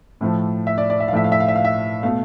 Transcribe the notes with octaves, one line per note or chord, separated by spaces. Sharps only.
A2 F3 A3
E5
D5
D5
E5
F5
A2 F3 A3 E5
F5
E5
F5
E5
F5
E5
B2 A3 F5